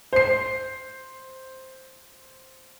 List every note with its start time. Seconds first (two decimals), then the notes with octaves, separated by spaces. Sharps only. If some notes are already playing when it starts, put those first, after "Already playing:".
0.13 C5 C7